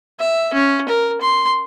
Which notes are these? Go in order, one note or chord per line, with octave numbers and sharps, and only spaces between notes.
E5
C#4
A#4
C6